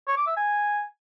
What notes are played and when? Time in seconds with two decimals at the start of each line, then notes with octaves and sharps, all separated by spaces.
0.07 C#5
0.17 D6
0.27 E5
0.37 G#5